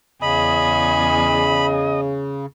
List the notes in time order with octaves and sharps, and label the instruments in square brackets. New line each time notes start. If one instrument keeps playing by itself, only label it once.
[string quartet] E2 G#4 [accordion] C#3 [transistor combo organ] D#5 [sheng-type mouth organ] B5